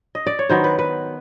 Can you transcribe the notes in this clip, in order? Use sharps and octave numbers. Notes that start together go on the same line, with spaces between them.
D#5
D5
C#5
D#3 F#3 B3 C5
B4
B4